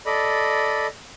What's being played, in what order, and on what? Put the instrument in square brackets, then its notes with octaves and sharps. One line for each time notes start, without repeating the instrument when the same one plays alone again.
[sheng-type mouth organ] A4 D5 D#5 B5